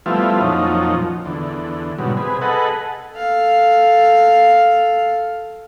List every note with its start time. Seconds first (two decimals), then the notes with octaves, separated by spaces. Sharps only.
0.06 F3 G3 A3 B3 E4 F4
0.41 F2 A#2 F3 F#3 C#4 D#4
1.25 E2 D3
1.98 G#2 B2 F#3 G3
2.17 C3 G#4 B4
2.41 G#4 A4 B4 D#5 F#5
3.13 A4 F5